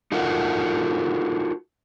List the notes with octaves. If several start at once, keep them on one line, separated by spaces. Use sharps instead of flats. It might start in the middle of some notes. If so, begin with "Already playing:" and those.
D#4 F4 F#4 A4 A#4 F#5